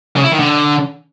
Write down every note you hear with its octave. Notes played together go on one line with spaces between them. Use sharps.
C#3
E4
D#3
D3